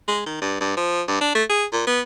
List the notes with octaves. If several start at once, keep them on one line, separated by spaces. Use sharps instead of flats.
G#3
D#3
G2
G2
F3
G2
D4
A3
G#4
A#2
B3